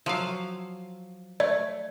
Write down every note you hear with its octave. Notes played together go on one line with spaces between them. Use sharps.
F3 F#3 F5
A3 D5